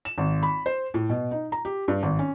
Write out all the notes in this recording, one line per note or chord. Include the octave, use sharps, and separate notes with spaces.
E7
G#1
B5
C5
A2
B2
D#4
A#5
G4
G2
G#1
C#4